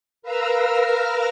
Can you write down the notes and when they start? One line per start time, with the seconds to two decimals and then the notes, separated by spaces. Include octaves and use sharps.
0.22 A#4 B4 F5 A#5 E6 F6